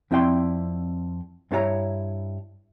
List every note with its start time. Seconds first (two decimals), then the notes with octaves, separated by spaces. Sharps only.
0.11 F2 C4 E4 D5 G5 C6
1.51 G2 C4 E4 A4 C#5 A#5